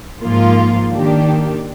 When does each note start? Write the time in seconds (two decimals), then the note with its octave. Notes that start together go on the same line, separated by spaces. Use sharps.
0.22 G#2 F3 A#3 F4
0.92 D#3 A#3 D4 G4